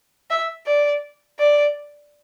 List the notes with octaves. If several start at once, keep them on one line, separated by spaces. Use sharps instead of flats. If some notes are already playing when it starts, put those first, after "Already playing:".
E5
D5
D5